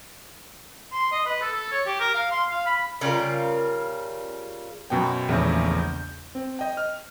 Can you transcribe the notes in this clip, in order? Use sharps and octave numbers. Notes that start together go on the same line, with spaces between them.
C6
D#5
B4
A4
A4
C#5
G4
A#4
F5
C6
F5
B5
C#3 G3 F4 A#4
F#2 B2 B3 G5
A#1 E2 C#3 A3
G6
C4
D#5 G5
F6